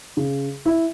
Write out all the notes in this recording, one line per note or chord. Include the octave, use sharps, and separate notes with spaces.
C#3
E4